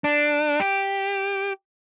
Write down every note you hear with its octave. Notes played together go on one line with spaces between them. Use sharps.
D4
G4